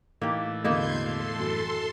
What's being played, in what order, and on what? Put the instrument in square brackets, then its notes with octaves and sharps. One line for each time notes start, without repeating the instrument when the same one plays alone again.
[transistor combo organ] A2 E3 [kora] A#3 G4 [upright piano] D#4
[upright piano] E1 D3 [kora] A#3 D#4 E4 [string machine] C6 G6 G#6
[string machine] A4 C6 [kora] F5
[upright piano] F#2